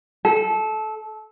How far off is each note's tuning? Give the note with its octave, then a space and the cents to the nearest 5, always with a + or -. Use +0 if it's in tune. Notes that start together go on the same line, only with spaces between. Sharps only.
A4 -20